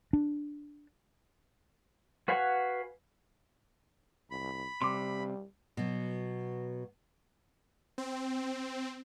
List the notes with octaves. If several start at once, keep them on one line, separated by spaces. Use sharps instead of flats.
D4
F#4 B4 F5 F#5 G#5
C2 B5
C3 G3 C6 D6
B2 F#3
C4